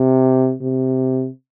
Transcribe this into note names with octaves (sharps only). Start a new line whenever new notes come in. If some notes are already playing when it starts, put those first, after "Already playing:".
Already playing: C3
C3